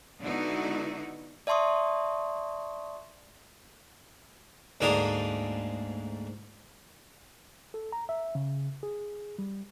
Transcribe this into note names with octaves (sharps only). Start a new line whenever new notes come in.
D3 G#3 B3 D#4 E4 F#4
D5 E5 A5 C6 C#6 D#6
D2 G#2 A#3 D4 A#5 D#6
A4
A#5
E5
C#3
G#4
G3